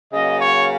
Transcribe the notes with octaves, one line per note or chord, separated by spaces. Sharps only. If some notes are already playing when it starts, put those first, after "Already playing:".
C#3 F#3 A#3 C#4 D#5
C#5